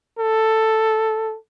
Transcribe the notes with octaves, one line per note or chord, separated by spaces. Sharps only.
A4